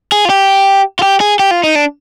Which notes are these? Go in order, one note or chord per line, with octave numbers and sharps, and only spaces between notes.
G#4
F4
G4
F4
G4
G#4
G4
F4
D#4
D4